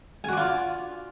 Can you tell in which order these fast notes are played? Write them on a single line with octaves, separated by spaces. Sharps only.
G#5 F#4 D5 F4